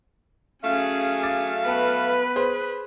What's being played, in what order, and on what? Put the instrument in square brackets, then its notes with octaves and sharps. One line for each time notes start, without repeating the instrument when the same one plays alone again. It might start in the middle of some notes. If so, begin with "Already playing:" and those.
[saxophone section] F#3 A3 F5 [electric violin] C#4 G#4
[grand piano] D6 A6
[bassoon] B3 [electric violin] B4 [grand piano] F#5 G5 A5
[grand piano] G#4 C5